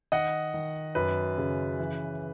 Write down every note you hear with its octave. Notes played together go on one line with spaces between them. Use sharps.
D#3 D#5 F#5
D#3
F#2 B4
C#3
E3